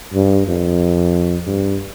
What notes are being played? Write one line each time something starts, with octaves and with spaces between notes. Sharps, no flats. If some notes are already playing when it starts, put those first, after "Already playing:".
G2
F2
G2